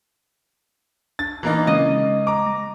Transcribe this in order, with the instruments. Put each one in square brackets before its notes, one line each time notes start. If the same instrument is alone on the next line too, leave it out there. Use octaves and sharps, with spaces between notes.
[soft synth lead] D4 [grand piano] A6
[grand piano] E3 A#3 D#4
[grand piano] C#3 [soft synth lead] G#3 [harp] D#5
[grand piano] A#5 D6
[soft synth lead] A#6